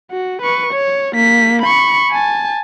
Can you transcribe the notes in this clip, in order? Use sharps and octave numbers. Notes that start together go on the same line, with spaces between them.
F#4
B4 C#6
C#5
A#3 B6
B5 C#6
G#5 A5